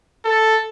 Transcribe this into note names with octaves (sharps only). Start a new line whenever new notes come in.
A4